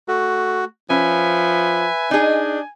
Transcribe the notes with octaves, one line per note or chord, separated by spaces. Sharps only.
A3 F#4
F3 C#4 B4 E5 G#5
D4 D#4 G#4